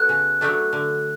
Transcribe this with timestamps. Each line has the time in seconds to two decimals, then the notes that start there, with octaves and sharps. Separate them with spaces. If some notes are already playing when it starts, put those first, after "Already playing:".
Already playing: B3 F#4 A4 F#6
0.09 C#3
0.41 F#3 A3 D4
0.73 D3